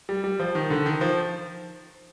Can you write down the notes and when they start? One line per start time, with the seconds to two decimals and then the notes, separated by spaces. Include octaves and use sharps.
0.09 G3
0.24 G3
0.40 F3
0.55 D#3
0.70 D3
0.86 D#3
1.01 F3